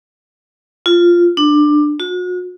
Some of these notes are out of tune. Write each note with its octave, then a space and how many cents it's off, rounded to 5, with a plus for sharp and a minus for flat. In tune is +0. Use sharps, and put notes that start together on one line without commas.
F4 -5
D4 +15
F#4 -40